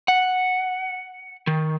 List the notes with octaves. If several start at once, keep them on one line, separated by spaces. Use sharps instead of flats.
F#5
D#3